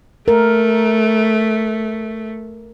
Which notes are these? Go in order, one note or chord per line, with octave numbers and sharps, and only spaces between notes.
A3 A#4